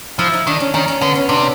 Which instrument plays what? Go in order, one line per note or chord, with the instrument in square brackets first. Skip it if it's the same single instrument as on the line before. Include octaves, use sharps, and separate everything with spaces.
[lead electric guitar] F3 [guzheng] E4
[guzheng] D#4
[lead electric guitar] D#3 [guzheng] D4
[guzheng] C#4
[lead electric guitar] D#3 [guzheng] C#4
[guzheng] C#4
[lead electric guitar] D3 [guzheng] B3
[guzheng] C#4
[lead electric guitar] C3 [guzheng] D4